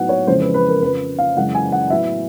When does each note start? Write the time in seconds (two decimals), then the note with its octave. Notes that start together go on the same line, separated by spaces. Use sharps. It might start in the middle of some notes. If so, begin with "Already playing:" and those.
Already playing: A2 F#3 B3 D#4 F#5
0.09 C#5
0.27 F2 C#3 E3 G#3 C5
0.41 B4
0.54 B4
0.69 A#4
0.82 F2 C#3 F3 B4
1.19 F5
1.36 F#2 C#3 E3 G#3 F#5
1.55 G#5
1.72 F#5
1.90 A2 F#3 B3 E4 E5